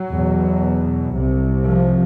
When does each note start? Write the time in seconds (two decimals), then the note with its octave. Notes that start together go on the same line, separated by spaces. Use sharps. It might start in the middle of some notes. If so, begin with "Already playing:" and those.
Already playing: F#3
0.11 E2 B2
1.14 C2 C3
1.65 F3